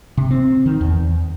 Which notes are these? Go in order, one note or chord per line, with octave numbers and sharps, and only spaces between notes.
C3
C4
D#3
E2